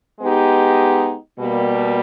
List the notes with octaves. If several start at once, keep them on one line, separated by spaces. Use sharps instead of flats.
G#3 B3 D#4 G4
B2 G3 A#3